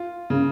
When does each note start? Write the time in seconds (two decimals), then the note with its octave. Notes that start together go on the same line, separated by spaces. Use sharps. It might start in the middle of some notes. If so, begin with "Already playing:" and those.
Already playing: F4
0.30 C#3